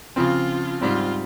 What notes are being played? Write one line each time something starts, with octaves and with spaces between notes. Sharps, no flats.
C#3 F3 C4 F4
G#2 G3 C4 F4